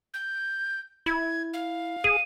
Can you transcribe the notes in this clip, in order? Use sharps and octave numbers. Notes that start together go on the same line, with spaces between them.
G6
E4 G#6
F5
G#4 D#7